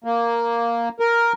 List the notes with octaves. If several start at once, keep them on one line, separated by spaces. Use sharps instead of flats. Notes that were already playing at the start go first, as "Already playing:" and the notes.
A#3
A#4